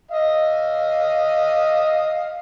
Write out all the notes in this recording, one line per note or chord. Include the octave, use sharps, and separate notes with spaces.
D#5 F5